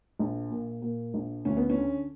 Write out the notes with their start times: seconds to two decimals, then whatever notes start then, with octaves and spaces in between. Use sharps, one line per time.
0.19 A#1
0.50 A#2
0.82 A#2
1.14 A#1
1.45 D2 C#4
1.57 B3
1.70 C#4
1.76 D3